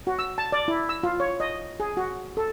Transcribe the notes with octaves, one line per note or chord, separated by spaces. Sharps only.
F#4
E6
A5
D5
E4
E6
F4
C#5
D#5
G#4
F#4
A4